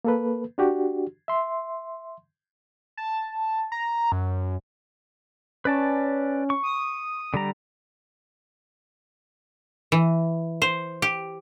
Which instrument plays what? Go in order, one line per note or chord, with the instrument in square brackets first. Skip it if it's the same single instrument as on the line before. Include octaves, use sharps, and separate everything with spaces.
[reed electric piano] A#3 A4 B4
D4 F#4 G4
E5 C6
[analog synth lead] A5
A#5
F#2
[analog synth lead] C#4 [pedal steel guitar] B4 D5 A5
[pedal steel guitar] C#6
[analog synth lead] D#6
[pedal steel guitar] D3 G3 A#5
[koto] E3
C5
G4